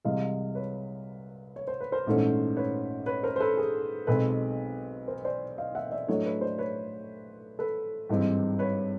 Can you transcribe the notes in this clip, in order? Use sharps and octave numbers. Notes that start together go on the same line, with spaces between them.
C2 C3 E3 G#3 D#5 F5
B4 C#5
C#5
C5
B4
A#4 C5
A#1 G#2 E3 A3 C#4
B4 C#5
B4 C#5
A#4 C5
C5
A4 B4
G#4 A#4
B1 B2 G#3 C4 A4 B4
A#4 C5
C5 D5
D#5 F5
E5 F#5
D5 E5
A2 F#3 A3 D4 C#5 D#5
B4 C#5
C5 D5
B4 C#5
A4 B4
G#1 G2 E3 G#3 C4
B4 C#5